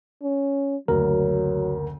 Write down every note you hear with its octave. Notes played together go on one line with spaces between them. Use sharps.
C#4
F#1 D2 F#3 A#4